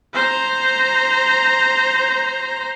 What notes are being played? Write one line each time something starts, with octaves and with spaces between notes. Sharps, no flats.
C5 A#5